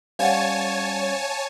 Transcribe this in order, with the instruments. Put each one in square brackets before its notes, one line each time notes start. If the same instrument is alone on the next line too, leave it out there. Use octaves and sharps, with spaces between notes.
[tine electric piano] G3 C#4 C5 [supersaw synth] C#5 G#5 A5 [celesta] F5 F#5